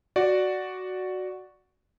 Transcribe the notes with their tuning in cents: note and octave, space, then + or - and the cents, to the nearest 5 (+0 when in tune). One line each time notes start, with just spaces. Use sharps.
F#4 +0 D5 +0